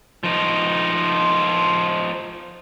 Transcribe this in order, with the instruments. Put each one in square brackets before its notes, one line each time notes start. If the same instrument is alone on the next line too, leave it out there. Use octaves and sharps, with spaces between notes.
[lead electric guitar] F3 D#4